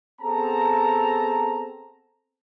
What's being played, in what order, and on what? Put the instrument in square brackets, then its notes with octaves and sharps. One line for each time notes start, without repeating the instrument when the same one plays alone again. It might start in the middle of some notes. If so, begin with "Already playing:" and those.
[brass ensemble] B3 C4 G#4 A4 A5 A#5